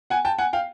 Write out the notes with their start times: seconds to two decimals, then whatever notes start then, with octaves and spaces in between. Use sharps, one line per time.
0.10 F#5 G#5
0.25 G5 A5
0.38 F#5 G#5
0.53 F5 G5